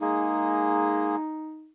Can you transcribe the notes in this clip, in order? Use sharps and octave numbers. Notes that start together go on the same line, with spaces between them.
G#3 A#3 D#4 G#4